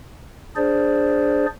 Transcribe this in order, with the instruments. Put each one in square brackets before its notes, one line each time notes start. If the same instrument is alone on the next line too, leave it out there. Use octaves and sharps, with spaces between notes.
[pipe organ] D4 G#4 C5 D5